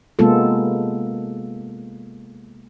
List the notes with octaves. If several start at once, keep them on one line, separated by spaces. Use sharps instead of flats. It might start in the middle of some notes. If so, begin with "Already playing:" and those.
C3 G#3 A#3 B3 F4 A4